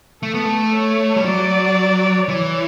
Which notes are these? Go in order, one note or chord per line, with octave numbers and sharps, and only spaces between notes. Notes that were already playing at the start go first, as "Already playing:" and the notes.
A3 A4
B3
A3
C#5
G3
F#3 D5
E3 C#5